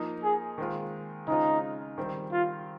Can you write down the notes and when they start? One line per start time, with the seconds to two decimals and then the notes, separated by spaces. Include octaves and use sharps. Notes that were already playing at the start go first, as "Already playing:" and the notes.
Already playing: F3 A#3 D#4
0.23 G#4
0.58 D#3 G#3 C4 F4
1.27 C#3 G#3 C4 D#4 F4
1.98 D#3 G3 C4
2.32 F4